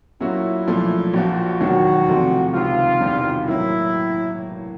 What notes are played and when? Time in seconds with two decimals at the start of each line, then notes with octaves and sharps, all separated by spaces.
0.20 A#2 F#3 A#3 C#4 E4 F#4
0.67 B1 A#2 F3 A3
1.13 A#1 A#2 F3 F#4
1.60 E1 D#2 D#3 F#3 F#4
2.08 E2 C3 F3 A3 C4
2.53 C#2 C3 D#3 F4
3.01 E1 E2 C3 D#3 G3
3.47 A2 F#3 A#3 E4